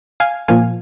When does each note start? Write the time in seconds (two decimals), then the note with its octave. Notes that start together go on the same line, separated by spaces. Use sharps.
0.20 F5 G#5
0.48 A#2 F3 A#3 F5 G#5